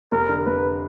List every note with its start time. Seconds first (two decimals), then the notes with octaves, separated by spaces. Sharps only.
0.12 F1 A#4
0.29 D3
0.46 F1 B4